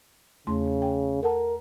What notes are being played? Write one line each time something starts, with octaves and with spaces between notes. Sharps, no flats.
E2 C#3 A3 C6
G5
A4 A#4 F#5 A5